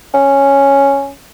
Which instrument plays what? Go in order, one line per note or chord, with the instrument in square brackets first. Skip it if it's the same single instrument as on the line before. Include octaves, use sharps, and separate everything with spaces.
[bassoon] C#4